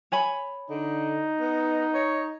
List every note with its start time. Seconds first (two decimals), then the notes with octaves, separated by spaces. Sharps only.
0.12 C#5 G#5 B5
0.70 D3 D#4
1.41 B3
1.94 C#5